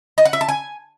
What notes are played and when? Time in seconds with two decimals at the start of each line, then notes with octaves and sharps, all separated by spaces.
0.18 D#5
0.25 F#5
0.33 E5
0.41 A5
0.49 G#5